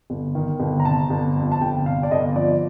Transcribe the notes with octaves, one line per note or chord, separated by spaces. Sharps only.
G1
D#3
G1
A#5
C3 A5
G1
F2
A5
G1 G5
C3 F5
D5
G1 D#5
F3 D5